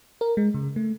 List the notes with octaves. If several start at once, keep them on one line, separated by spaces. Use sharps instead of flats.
A#4
G#3
C#3
A3